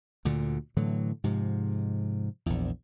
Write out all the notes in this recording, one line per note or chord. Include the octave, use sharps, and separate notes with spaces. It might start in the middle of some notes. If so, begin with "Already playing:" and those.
D2 A#2 D3
A2 D3 E3 F#3
G#2 C3 F3
A#1 E2